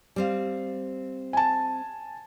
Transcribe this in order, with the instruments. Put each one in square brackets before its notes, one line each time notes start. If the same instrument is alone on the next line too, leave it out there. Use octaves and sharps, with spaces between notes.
[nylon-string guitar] G3 C4 F5
[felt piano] G#5 A5